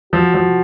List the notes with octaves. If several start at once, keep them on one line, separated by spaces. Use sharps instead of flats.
F3 F#4
F3